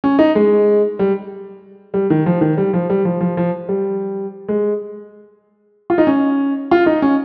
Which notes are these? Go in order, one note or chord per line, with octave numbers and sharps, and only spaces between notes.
C#4
D#4
G#3
G3
G3
D#3
F3
D#3
G3
F3
G3
F3
F3
F3
G3
G#3
F4
D#4
C#4
F4
D#4
C#4